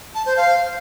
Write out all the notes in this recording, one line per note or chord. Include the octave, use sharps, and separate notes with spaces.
A5
C5
F5